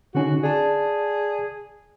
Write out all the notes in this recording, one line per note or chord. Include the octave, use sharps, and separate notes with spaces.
D3 C#4 D#4 F#4
G#4 D5 A5